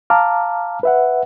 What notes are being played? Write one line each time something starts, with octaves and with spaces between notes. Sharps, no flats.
F5 A5 A#5 D6 F6
B4 E5 F#5